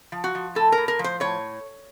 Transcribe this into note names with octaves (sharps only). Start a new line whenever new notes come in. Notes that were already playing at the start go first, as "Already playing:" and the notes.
F3
F#4
F3
A2 A4
A#4
A2
A#4
F3
C5
A2 C#5